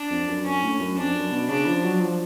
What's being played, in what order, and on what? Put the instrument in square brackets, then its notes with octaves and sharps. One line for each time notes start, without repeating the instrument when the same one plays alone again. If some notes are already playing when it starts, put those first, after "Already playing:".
Already playing: [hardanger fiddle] D4
[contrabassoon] F2
F#2
[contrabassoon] F#2 [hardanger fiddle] C#4
[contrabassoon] A2
F#2
[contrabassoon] F2 [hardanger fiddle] D4
[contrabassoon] F#2
B2
[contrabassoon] C#3 [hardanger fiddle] D4
[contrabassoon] F3
F#3
F3